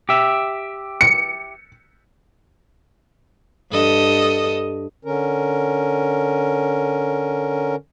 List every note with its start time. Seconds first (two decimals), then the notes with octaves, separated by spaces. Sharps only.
0.09 G4 E5
1.01 C#7
3.71 G2 A4 D#5
5.05 D3 C#4 A#4